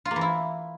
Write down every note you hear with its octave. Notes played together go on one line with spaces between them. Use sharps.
F4
A#3
E3
E4